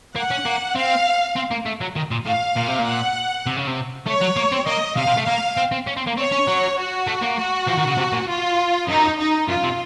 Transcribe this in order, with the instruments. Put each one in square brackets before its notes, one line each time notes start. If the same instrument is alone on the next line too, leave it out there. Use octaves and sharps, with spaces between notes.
[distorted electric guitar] A#3 [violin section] F#5
[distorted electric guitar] C#4
A#3
[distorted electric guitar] C4 [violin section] F5
[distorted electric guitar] C4
A#3
A3
F#3
D#3
A#2
[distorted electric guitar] A2 [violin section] F5
[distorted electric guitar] A#2
C3
A#2
[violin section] F#5
[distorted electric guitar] C3
C#3
C3
[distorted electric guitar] A3 [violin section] C#5
[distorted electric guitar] F#3
A#3
C4
[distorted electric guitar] A#3 [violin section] D#5
[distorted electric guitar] C3 [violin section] F5
[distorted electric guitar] C3
A3
[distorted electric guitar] A#3 [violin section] F5
[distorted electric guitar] C4
C4
C#4
C4
A#3
[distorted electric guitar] C4 [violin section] C#5
[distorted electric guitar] C#4
F#3
[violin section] F#4
[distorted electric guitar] A3
A#3
[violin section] F#4
[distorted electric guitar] F3
D#3
C#3
C3
A#2
[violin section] F4
[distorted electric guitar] F#2 [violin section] D#4
[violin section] D#4
[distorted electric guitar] F#2 [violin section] F4
[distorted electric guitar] C3